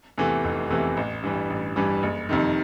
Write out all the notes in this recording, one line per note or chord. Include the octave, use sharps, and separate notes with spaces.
E2 C3 E3 A3
F1
E2 C3 E3 A3
A1
G2 E3 G3
A1
G2 E3 G3
F#1
F2 C3 D#3